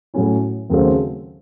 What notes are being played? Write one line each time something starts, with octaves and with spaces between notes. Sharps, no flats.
A2 F#3 A3 C#4 E4
D#2 C#3 F#3 A3 C4